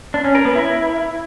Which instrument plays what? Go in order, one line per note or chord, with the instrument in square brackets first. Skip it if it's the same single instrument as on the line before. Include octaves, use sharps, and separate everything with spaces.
[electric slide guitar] D4
C#4
A#4
B3
E4